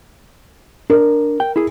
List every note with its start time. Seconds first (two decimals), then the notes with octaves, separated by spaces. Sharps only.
0.90 D4 A#4
1.40 G5
1.56 E4 G#4